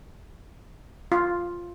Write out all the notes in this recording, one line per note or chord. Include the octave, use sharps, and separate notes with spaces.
F4